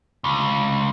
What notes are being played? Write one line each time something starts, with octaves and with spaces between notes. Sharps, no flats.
C#2